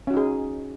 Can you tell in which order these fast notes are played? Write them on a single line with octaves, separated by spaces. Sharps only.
C#4 F#4 D#4 G#4